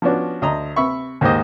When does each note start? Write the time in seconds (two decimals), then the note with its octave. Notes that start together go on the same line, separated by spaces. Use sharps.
0.02 F3 B3 C#4 D4 F#4
0.42 D2 D#5 A#5
0.76 C3 E5 B5 C#6
1.21 D#2 G#2 G4 C5 D#5